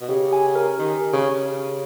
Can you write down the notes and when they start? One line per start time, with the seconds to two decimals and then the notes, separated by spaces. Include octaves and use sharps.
0.01 B2
0.09 C#3 G4
0.33 G#5
0.55 A#4
0.78 D#3 G4
1.02 G4
1.13 C#3
1.25 G#5
1.30 C#3
1.49 G4